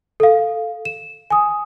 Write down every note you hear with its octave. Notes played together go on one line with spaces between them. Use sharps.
A4 F5
E7
G#5 D#6